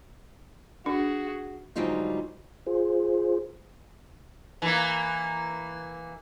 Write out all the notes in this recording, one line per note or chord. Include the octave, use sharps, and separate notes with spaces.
D4 F#4 G#4
G#2 D3 F#3 G3 D#4 F4
F4 G#4 C5
E3 A#3